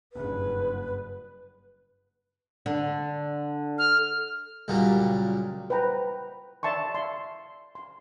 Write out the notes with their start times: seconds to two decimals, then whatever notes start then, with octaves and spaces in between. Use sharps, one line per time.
0.13 F#1 G2 B4
2.66 D3
3.78 F6
4.68 C#2 A#2 F#3 G3
5.70 B4 C5 G5 A#5
6.63 D5 E5 A5 C6 C#6
6.95 E5 C6
7.75 C6